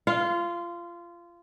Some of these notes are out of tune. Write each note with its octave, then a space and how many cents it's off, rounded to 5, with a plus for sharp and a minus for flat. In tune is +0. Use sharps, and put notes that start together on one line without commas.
F4 -20 F5 +0